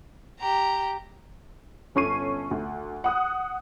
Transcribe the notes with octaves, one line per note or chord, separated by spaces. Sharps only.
G4 A#5
G1 C#4 A4 C#6 C7 D#7
D2
F#5 D#6 F#6